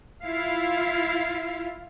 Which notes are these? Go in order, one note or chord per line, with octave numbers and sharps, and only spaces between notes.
E4 F4 F5